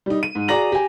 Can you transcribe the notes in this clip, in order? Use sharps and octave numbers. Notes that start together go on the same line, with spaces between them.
G3 D#4
D#7
G#2
F#4 G#4 D5 A#5 A#6 F#7
G4 G#5